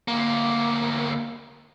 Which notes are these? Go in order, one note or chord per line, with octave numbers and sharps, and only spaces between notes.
D2 A#3